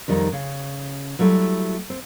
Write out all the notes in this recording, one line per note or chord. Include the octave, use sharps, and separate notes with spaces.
F2 D#3 G3 D#4
C#3
F#3 G3 A3 E4
C4